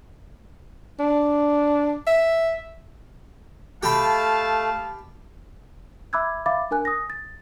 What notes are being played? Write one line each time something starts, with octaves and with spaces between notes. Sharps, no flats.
D4
E5
A3 G4 F5 A5 B5
E5 B5 D6 E6 F#6 G#6
E5 F5 B5 D6 A6
D4 A#4 G#5 F#6
D#6 A#6
A6